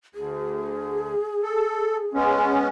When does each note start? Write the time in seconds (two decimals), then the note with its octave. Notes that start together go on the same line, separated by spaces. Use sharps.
0.15 D2 G#4
1.43 A4
2.14 G#3 B3 C#4